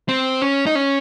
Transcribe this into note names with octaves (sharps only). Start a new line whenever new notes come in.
C4
C#4
D#4
C#4